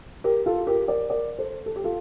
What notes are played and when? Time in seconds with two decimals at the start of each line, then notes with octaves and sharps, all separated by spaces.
0.24 G4 A#4
0.46 F4 A4
0.67 G4 A#4
0.88 A#4 D5
1.10 A#4 D5
1.38 A4 C5
1.66 A4
1.76 G4
1.84 F4 A4